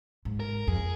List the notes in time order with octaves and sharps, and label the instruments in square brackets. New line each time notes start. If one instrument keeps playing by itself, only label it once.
[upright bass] G#2
[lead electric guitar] A#4
[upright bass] F2 [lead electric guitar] G#4